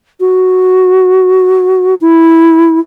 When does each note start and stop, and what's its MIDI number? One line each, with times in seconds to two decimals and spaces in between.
0.20 1.94 66
2.01 2.79 64